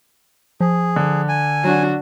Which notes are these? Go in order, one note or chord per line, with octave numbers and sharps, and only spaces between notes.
F3 G#4
D3
G#5
F#3 D4 F#4